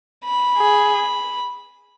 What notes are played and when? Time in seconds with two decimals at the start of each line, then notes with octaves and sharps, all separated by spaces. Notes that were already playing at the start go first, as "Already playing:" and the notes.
0.25 B5
0.58 G#4